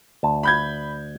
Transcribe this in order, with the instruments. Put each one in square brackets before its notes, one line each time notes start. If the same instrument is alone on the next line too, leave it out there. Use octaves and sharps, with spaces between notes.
[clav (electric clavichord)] D2 A5
[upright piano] B5 G6 G#6